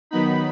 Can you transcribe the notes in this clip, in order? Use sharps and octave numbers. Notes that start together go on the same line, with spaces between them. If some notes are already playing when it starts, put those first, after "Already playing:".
D#3 F#3 B3 D#4 B5